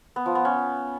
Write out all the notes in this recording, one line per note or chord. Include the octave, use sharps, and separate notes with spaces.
B3
F3
B3
C#4